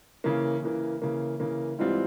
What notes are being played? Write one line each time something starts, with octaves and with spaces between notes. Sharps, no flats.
C#3 E3 A#3
C#3 E3 A#3
C#3 E3 A#3
C#3 E3 A#3
G#2 E3 G3 C4 F4